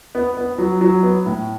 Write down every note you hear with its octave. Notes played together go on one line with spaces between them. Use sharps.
B3
B3
F#3
F#3
B3
A2